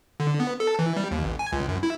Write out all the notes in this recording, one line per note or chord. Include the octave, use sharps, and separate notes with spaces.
D3
B3
A4
E3
G3
D#2
A1
G#5
C#2
F#2
E4